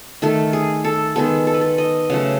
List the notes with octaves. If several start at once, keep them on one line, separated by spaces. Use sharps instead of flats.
D#3 A3 A4
G#4
A4
D#3 G#3 B3 A4
A4
B4
A4
D#5
C#3 F#3 A3 F#5